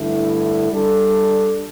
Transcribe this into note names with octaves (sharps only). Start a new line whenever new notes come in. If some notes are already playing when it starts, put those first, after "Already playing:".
Already playing: G2 D3 A3 E4
G3 D4 A4